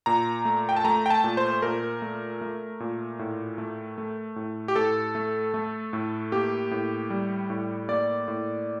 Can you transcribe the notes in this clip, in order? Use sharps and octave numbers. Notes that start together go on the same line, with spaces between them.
A#2 A#5
A3
G5
A5
A3 A#5
G5
A5
A#2
C5
A#2 A#4
A3
A3
A#2
A2
A3
A3
A2
G4
A2 A4
A3
A3
A2
A#3 G4
A2
G3
A2
A#3 D5
A2